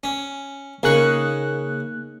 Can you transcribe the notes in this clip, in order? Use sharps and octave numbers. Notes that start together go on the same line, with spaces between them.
C#4
C#3 A#3 C#4 D#4 G#4 C#6 F#6